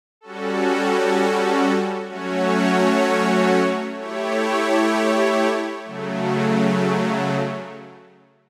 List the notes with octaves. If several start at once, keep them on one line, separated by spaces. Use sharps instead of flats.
G3 C#4 F#4 A4
F#3 A3 C#4 F#4 C#5
A3 E4 G4 C#5
C#3 F#3 A3